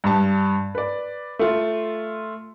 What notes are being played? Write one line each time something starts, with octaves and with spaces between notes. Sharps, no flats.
G2 A5
B4 D5
A3 F4